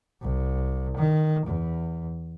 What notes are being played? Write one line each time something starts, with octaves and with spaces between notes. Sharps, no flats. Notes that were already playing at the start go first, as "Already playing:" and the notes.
C2
D#3
E2